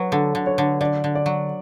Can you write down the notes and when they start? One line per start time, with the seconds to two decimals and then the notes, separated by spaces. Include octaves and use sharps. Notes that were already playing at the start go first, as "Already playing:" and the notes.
Already playing: F#3 B4
0.12 D3 A4
0.35 D3
0.46 C#5
0.58 D3
0.81 D3 D5
1.04 D3
1.15 D5
1.26 F#3